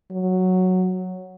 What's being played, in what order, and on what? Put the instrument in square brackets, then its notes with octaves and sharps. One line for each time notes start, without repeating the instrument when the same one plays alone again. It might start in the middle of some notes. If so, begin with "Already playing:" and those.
[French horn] F#3